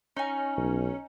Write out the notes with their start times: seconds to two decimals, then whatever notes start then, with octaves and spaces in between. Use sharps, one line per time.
0.16 C#4 D#4 G#5
0.57 B1